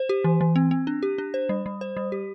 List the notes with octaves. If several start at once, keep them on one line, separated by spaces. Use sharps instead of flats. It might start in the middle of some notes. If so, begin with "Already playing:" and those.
Already playing: C5
G4
E3
E3
C4
C4
D4
G4
D4
C5
G3
G3
C5
G3
G4